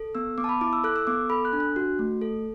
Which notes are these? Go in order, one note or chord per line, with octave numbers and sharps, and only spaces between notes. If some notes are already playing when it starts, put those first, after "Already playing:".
Already playing: A4
B3 E6
B3 D6
A5
B5
E4 D6
E6
A4 F#6
E6
B3 D6
A4 B5
F#6
D4
F#6
F#4
A3
A4